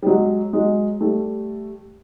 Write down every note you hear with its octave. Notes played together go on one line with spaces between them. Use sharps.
G3
F#3 G#3
F#3 G#3
G3 A3